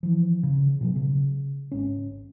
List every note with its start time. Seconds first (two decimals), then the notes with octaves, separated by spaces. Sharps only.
0.03 E3 F3
0.43 C#3
0.81 B2 F3 F#3
0.96 C#3
1.72 G#1 C#4